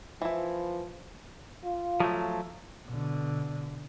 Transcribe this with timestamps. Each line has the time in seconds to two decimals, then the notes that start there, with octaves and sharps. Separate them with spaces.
0.22 E3 F3 E4
1.64 F4
2.00 F3 F#3 A3
2.87 B2 D3